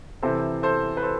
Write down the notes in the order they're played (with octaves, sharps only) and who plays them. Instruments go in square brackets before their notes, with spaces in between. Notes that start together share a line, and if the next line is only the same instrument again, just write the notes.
[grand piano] C3 E3 A4 C5
A4 C5
B4
A4 C5